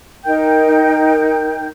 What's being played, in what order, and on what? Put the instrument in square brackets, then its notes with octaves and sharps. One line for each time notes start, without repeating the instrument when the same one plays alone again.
[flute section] D#4 A#4 G5 G6